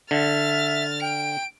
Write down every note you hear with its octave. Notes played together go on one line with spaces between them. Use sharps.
D3 E5 F6 A6
G5 D7